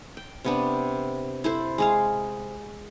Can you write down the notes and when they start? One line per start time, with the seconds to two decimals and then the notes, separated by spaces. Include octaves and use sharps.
0.17 G5
0.45 C3 B3 D4
1.44 E4 A4 C5
1.78 G#3 G#4 F5